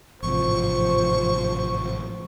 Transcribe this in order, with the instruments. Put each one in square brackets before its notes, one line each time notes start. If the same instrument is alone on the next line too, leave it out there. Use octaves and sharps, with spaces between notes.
[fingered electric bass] A1 G#2 C3 [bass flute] F3 [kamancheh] C5 [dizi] C#6